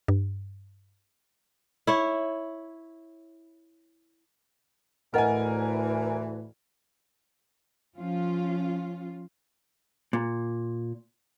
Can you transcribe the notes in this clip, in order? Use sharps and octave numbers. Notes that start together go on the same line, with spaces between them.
G2
E4 C#5
D2 A2 E3 A#4 B4 D#5 F#5 G#5
F3 C#4 F4
A#2